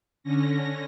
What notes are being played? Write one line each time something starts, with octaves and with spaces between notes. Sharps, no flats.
D3 C#4 A#6